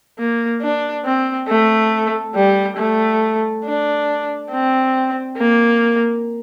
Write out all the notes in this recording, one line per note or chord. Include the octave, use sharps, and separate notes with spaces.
A#3
D4
C4
A3
G3
A3
D4
C4
A#3